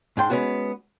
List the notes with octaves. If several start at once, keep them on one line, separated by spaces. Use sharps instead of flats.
G#2 D4 G5 C6
G#3 A#3 B3 C#4 F#4